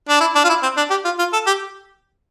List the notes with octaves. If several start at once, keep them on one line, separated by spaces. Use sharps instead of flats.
D4
E4
D4
F4
E4
C4
D4
G4
F4
F4
A4
G4